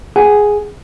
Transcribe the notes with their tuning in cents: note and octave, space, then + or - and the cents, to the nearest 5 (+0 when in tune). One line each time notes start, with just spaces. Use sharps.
G#4 +0 F#5 +35